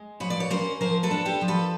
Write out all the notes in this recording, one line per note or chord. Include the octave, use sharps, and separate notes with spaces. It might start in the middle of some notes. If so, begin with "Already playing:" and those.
Already playing: G#3
F3 B4 C#5
D5
C#5
C#4 A#4 C5
F3 A#4 C5
A4 B4
D4
G4 A4
F3
A4 B4